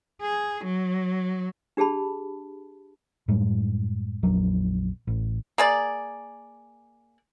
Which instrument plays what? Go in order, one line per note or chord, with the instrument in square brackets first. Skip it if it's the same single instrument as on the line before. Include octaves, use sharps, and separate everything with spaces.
[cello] G#4
F#3
[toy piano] D4 G4 G#4 A5 B5
[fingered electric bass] F#2 A2 G3 G#3
A#1 F2 F#3
A1
[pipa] A#3 G#4 D5